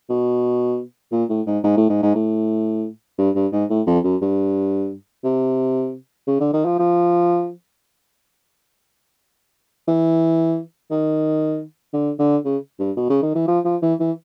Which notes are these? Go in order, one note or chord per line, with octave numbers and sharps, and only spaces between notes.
B2
A#2
A2
G#2
G#2
A2
G#2
G#2
A2
G2
G2
G#2
A2
F2
F#2
G2
C3
C#3
D3
D#3
F3
F3
E3
D#3
D3
D3
C#3
G2
B2
C#3
D#3
E3
F3
F3
E3
E3